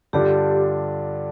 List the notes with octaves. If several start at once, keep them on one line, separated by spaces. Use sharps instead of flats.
G2 D3 G3 D4 F4 G4